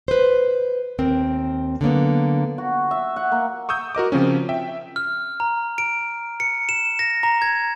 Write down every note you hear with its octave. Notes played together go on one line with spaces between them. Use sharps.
B4 C5
D#2 C4 A#4
D3 F#3 A#3 B3
F#4
E5
F#5
A#3
C#6 D#6 E6 G6
F#4 A#4 D#5 D6
C#3 F3 C4 C#4
E5 G5
F6
A#5
D7
C#7
E7
A#6
A#5
G#6